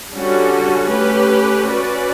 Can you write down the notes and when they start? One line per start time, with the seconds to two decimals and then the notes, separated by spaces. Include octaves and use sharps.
0.13 D3 G3 C#4 F#4
0.89 A3 C#4 G4 B4
1.66 C#4 F#4 B4 D5